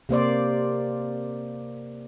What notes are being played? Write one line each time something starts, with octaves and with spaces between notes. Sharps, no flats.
C3 A#3 C5 D5